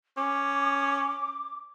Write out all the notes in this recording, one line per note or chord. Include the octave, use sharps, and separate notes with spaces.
C#4 D6